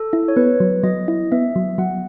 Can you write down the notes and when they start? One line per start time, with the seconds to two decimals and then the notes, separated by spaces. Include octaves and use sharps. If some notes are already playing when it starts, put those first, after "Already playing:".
Already playing: A4
0.13 E4
0.28 C#5
0.36 B3 B4
0.60 F#3
0.83 F#3 D#5
1.08 E4
1.32 B3 E5
1.56 F#3
1.78 F#3 F#5